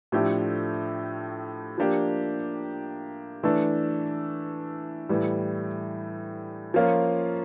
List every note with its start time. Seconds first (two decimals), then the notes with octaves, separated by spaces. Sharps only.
0.12 A2 F3 A3 D4 G4
1.78 F3 A#3 D4 G4
3.43 E3 A3 D4
5.09 A2 E3 G3
6.74 F3 A#3 C#4 F4 A#4